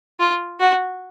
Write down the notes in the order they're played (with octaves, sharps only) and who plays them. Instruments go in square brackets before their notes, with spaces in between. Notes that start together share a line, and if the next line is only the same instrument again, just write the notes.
[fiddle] F4
F#4